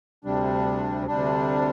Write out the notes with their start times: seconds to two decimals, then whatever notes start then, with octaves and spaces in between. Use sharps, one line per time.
0.24 D2 C3 G3 D4
1.07 D2 C3 G3 D4